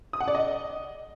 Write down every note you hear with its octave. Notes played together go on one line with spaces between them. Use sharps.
D#6
F#5
D5
D#5